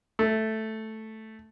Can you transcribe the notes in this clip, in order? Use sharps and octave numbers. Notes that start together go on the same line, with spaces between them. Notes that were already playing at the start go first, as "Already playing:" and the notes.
A3